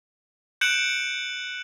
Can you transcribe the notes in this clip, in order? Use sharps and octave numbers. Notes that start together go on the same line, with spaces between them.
F#6 G6 C#7 D7 E7 F#7